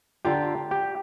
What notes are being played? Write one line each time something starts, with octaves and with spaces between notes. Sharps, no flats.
D3 F4 G4 G5 A#5
G4